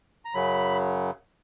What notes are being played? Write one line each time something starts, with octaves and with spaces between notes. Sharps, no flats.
A#5
F#2 C#3 F#3 B5